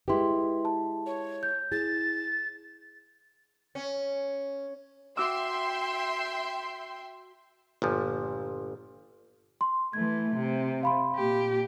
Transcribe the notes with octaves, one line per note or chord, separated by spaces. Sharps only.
G#3 E4 G4 B4 C6
A5
C#5
G6
E4 G#4 A6
C#4
F#4 E5 G5 C6 D6 E6
G1 A#2 F3
C6
E3 A3 G#6
C3
F5 B5 C6
A#2 G4